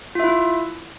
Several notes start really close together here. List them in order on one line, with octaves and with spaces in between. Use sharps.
F4 E5 E4